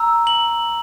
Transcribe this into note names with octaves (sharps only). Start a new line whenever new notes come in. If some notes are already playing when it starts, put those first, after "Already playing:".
Already playing: A#5 E6
F#7